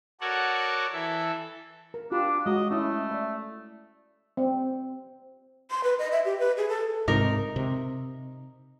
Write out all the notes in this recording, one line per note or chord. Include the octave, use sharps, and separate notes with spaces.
F#4 A4 A#4 C#5 D5 F#5
E3 A4 E5
A#4
D4 F4 G4 B5
G#3 F#4 D#5 A#5
A3 C#4 E4
D5 E5
C4
C6
B4
D#5
E5
G4
B4
G#4
A4
G#2 C3 D#4 A#4
C3